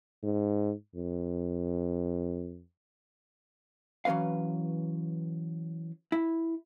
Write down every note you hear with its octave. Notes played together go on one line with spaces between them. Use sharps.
G#2
F2
E3 F#3 C#4 B4 F5
E4